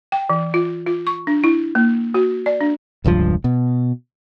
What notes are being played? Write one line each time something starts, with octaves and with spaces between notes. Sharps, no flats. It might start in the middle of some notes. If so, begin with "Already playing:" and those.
G5
E3
F4
F4
C#6
D4
E4
A#3
F#4
D5
D4
E1 C#2 G2 F3
B2